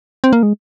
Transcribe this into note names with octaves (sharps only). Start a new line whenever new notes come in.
C4
A#3
G#3